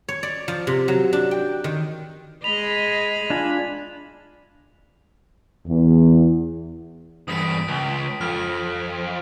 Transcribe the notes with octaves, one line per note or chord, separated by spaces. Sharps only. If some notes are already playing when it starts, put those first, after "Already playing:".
C#5
D5
F3
C3
F#3
D4
G5
D#3
G#3 D#5 B5 F7
D4 F4 G#5
E2
E2 G2 D#6 B6 D7
C#2
F2 F6